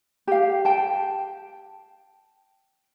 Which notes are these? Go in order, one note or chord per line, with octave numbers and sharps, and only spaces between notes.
G4 F5
G5 A5